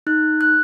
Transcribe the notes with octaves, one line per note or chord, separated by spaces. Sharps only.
D#4 F#6
F#6